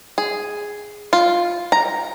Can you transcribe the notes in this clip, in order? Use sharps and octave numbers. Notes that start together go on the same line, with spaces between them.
G#4
F4
A#5